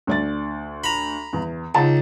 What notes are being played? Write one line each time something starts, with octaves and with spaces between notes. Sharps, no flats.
D2 D5 A6
A#5 B5
E2
C#2 D#4 A5